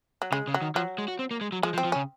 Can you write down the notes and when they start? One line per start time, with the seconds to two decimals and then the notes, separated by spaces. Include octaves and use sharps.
0.22 F#3
0.32 C#3 G#3
0.48 C#3
0.54 F#3
0.62 D#3
0.75 F3 F#3
0.98 G#3
1.08 F#4
1.19 C4
1.31 A#3
1.41 G#3
1.52 F#3
1.63 F3 G#3
1.74 F3
1.78 C4
1.85 F3
1.92 C#3 C#4